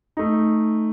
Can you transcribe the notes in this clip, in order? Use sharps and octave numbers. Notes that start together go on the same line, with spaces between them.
A3 D#4